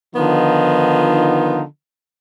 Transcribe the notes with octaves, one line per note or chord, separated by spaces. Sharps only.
D3 D#3 F3 B3 D#4 F4